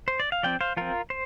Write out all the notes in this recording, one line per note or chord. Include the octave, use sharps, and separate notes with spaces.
C5
D5
F5
F3 C4 D5 G5
C5 F5
F3 C4 F4 A#4
C5